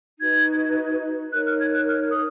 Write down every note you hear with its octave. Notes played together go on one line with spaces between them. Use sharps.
D#4 F#4 B4 G#6
D#4 A#4 C#5 F#6
F6
G#6
F#6
F6
D#6